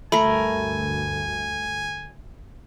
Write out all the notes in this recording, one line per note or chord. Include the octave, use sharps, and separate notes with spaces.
D2 G2 A3 A#4 G#5 B5